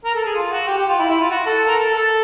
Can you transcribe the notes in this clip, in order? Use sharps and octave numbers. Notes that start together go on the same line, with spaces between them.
A#4
A4
G#4
F4
F#4
G4
G4
F4
E4
E4
F4
F#4
A4
A#4
A4
A4